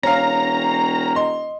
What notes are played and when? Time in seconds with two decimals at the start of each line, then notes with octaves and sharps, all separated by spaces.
0.03 E1 C#4 F5 A#5
1.16 D#5 C6